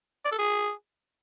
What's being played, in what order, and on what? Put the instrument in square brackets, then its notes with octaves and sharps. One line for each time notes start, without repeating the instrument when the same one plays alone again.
[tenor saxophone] D5
A4
G#4